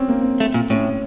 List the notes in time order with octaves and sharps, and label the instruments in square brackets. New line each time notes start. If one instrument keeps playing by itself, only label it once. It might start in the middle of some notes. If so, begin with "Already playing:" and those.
Already playing: [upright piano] C4 C#4
A#3
C4
[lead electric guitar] A3
A#2
[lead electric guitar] A2 [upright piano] C#4